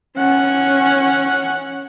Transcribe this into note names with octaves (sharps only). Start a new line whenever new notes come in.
C#4 F#5